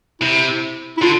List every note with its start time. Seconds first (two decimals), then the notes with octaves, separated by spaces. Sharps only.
0.21 C3 E4
0.98 E4
1.02 D3 F4